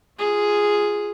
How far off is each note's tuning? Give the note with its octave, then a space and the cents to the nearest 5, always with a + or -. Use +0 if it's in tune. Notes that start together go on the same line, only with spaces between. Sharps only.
F4 +0 G#4 +0